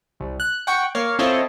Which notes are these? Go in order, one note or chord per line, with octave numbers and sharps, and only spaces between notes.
C2
F#6
F#5 G5 C#6
A#3 C#5 F5
C4 E4 F4 A4 C#5 D#5